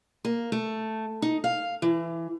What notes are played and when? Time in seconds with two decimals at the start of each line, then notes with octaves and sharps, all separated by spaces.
0.25 A#3
0.52 A3
1.22 D#4
1.44 F5
1.82 E3